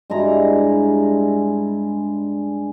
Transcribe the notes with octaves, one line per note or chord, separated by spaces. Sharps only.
G2 G#3 E4 A#5